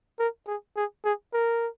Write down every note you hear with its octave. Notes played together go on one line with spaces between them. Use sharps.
A#4
G#4
G#4
G#4
A#4